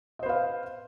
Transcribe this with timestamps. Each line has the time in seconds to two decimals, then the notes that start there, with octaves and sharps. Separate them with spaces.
0.19 D#5
0.23 C5
0.26 B4
0.29 F5